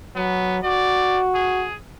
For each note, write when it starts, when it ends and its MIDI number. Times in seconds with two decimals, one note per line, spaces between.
0.16 0.62 54
0.16 0.57 59
0.63 1.66 66
0.63 1.20 74
1.35 1.74 68